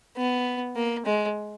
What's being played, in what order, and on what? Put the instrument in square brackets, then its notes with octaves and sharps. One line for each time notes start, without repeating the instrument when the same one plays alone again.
[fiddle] B3
A#3
G#3